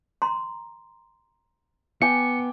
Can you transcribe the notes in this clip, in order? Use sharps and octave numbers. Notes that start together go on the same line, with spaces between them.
A#5 C6
B3 G5 G#5 D6 C#7